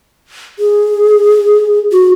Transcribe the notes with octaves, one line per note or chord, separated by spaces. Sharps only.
G#4
F#4